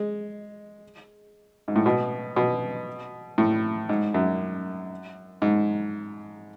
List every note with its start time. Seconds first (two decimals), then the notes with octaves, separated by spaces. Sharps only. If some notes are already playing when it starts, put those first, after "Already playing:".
Already playing: G#3
1.68 G#2
1.76 A2
1.86 B2
2.36 B2
3.38 A2
3.89 G#2
4.14 F#2
5.42 G#2